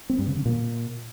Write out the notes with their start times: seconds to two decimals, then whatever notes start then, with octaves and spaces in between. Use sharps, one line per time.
0.09 C4
0.18 G2
0.27 C#3
0.36 D3
0.45 A#2